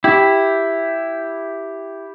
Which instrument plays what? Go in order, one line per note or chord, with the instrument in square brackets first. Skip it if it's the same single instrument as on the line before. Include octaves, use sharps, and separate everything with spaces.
[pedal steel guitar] E4 [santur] G4